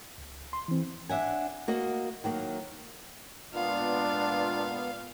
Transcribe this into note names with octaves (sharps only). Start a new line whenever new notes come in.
C#2
C6
E3 C4
D4 E5 F#5 G#5
A#3 F#4 D#5
D#3 F#3 A#3
A#2 G#3 B3 D4 F4 F5